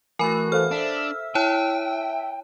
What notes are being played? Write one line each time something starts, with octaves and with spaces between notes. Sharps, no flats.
E3 A3 F#4 A#4 G#5 B5
A4 C5 F5 F6
D4 E5
E4 C#5 G5 A5